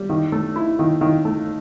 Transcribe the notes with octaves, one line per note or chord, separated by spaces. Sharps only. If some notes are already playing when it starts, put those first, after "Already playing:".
Already playing: G3
D#3
A3
E4
D#3
D#3
A3